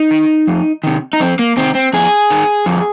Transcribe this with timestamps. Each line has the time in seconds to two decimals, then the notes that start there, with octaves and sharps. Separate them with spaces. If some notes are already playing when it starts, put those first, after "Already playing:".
Already playing: D#4
0.11 D#3
0.47 F2
0.84 C3 D#3
1.13 D#4
1.20 F2 C4
1.39 A#3
1.57 C3 D#3 C4
1.75 C4
1.93 F2 G#4
2.30 D#3
2.66 F2